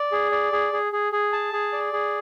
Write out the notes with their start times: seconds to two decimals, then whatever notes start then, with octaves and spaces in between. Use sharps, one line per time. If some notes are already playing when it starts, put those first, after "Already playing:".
Already playing: D5
0.12 G#4
0.32 D5
0.52 G#4
0.73 G#4
0.92 G#4
1.12 G#4
1.33 A5
1.53 G#4
1.73 D5
1.93 G#4